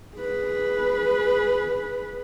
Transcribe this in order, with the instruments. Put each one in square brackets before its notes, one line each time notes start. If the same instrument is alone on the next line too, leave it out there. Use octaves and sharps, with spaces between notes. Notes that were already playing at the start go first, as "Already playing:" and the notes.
[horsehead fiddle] G#4 B4